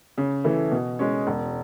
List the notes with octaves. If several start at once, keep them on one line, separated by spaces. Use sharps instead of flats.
C#3
E3 A3 E4 A4
B2
G#3 C#4
E1